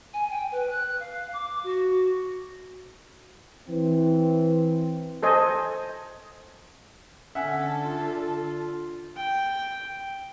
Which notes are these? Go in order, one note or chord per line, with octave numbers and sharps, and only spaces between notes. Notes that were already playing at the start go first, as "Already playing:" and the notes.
G#5
G5
B4
F#6
F5
D6
F#4
E3 C4
A4 C5 D#5 G#5
D3 C#4 A4 E5 F#5 G#5
F4
G5